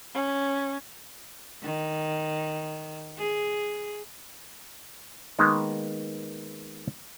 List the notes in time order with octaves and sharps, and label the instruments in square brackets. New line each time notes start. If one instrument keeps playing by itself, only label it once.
[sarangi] C#4
[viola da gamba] D#3
G#4
[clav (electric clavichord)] D#3 G#3 A#3 B3 D#4